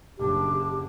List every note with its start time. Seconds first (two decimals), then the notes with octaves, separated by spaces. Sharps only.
0.18 F#1 D4 G4